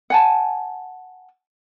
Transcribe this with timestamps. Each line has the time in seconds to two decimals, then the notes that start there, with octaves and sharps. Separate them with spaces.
0.10 F#5 G#5 A5